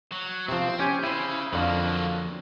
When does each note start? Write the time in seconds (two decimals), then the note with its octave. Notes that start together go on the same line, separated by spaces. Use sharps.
0.12 F#3
0.48 C3 F3 C4
0.79 C#4 G4 G#5
1.03 C#3 E4 C5
1.53 F2 D3 F3 F#3 A#3